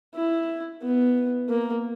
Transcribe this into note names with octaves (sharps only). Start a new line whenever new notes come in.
E4
B3
A#3